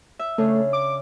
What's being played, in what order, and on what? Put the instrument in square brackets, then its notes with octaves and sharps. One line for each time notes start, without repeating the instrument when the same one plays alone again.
[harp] E5
[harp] C#3 D4 [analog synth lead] A3
[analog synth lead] D6